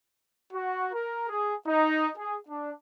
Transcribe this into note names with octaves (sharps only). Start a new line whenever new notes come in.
F#4
A#4
G#4
D#4
G#4
D4